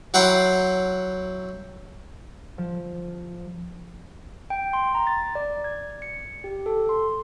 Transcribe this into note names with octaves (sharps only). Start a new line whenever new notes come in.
F#3 E4 F#5 G5 A#5 C6
F3
G5
C6
A#5
A6
D5
G#6
C#7
G4
A4
C6